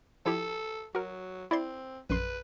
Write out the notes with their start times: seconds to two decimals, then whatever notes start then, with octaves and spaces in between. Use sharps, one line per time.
0.26 F3 E4 G4 A4
0.95 F#3 F#4 A#4
1.51 C4 E4 D5 C6
2.10 A#1 F#2 B4 C6